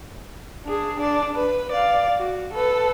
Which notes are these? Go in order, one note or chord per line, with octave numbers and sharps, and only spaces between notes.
D4 G#4
D4 D5
B4
D5 F5
F#4
A4 B4